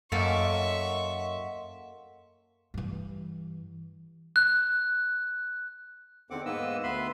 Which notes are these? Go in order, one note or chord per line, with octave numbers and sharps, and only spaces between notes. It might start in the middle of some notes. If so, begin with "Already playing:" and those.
F#2 A#3 A4 D#5 E5 F#5 C6 C#6
G2 E3
F#6
E2 D3 D#3 C4 F#5 D6
G#2 A#3 B3 B4 D#5 E6
D2 B3 B4 E5 B5 C6